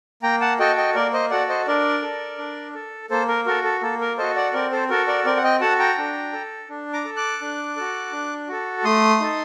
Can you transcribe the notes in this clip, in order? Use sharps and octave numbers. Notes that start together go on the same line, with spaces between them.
A#3 G5 A#5
F#5 A5
F#4 A4 D#5 G5
D#5 G5
A#3 A#4 D5
C5 D#5
F#4 A4 D5 F#5
C5 D#5
D4 A#4 D5
A4
D4
A4
A#3 A4 C5
A#4
F#4 A4 A#4
A4
A#3 A4
A#4
F#4 A4 C5 D#5
D5 F#5
C4 A#4 D5
A4 C5
F#4 A4 A#4
A#4 D5
C4 A#4 D5
F#5
D#5 G5
F#4 A4 F#5 A5
G5 A#5
D4
A4
D4
A#5 D6
A4
D6 F#6
D4
F#4 A4
D4
F#4 A4
A3 C6 D#6
D#4 A4